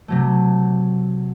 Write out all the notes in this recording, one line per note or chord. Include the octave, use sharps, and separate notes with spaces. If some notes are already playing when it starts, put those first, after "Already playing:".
C3 F#3 A3